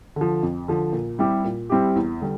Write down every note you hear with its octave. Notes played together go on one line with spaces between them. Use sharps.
D3 F3
F2
D3 F3
A#2
G3 C4 E4 G4
A#2
G3 C4 E4 G4
E2
D3 G3